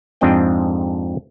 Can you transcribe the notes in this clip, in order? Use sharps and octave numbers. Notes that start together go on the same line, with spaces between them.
F2 G#2 C4 D4 D#5 G5